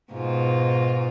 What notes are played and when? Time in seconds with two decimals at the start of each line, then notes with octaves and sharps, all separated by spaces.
0.12 G#2 B2 F4